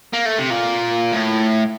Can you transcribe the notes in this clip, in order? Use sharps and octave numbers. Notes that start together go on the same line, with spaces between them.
A#3
A3
C3
A#2
A2